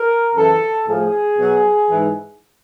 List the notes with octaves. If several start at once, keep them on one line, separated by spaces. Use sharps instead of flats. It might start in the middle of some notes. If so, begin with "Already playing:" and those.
Already playing: A#4
F#2 C#3 E3 A4
A2 F3 G#4
B2 F#3
G#2 E3